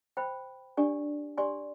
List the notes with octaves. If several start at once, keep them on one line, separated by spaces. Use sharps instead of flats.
C5 G5 B5
D4 G4 D5 G#5
G4 D5 G#5 C6